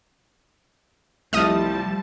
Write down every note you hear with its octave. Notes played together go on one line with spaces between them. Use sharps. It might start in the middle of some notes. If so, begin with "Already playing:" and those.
C2 F3 G3 A3 D#5 A5 D#6 F6